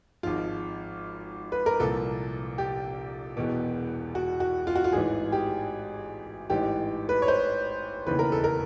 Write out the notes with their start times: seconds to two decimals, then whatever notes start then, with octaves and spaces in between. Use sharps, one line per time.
0.23 G#1 G#2 F3 F4
1.52 B4
1.66 A#4
1.80 C2 A#2 F3 A4
2.58 G4
3.37 E1 E2 B2
4.15 F#4
4.40 F#4
4.67 F4
4.76 F#4
4.84 F4
4.93 A1 G#2 E3 G#4
5.32 G4
6.50 A1 G#2 E3 G4
7.09 B4
7.22 C#5
7.28 C5
8.07 E1 D#2 C#3 E3 B4
8.19 A#4
8.32 A4
8.44 A#4